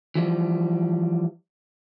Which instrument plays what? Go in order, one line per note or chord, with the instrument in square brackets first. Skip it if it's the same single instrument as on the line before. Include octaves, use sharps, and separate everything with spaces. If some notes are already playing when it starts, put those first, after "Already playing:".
[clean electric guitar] E3 F3 G3